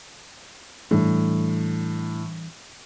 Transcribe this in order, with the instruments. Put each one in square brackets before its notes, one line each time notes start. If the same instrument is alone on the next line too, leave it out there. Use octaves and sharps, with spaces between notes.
[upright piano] A2 [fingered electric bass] E3 G3 D4